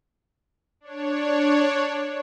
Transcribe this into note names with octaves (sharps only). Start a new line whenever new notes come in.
D4 C#5